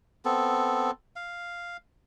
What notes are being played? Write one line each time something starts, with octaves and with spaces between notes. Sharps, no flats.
B3 C4 A4
F5